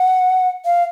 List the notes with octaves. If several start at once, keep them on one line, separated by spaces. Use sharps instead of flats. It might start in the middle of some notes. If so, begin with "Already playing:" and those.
Already playing: F#5
F5